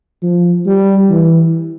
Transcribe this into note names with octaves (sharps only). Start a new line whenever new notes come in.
F3
G3
E3